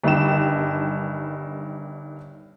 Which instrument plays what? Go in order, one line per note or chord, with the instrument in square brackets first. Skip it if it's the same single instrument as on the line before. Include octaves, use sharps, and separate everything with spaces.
[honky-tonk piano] G1 G2 D#3 G5 E7